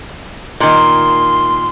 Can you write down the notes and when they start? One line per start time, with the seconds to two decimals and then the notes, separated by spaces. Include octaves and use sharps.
0.60 A#2 D#3 C6